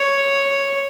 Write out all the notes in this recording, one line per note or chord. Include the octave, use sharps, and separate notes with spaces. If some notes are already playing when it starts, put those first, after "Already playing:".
Already playing: C#5